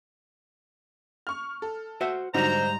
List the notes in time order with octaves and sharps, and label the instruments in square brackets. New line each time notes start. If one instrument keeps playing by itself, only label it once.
[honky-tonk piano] C#6 F6
A4
[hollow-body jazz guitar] F#4 C5 E5
[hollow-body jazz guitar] G#2 G3 D#4 [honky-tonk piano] D3 F#3 [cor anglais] C5 [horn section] A#5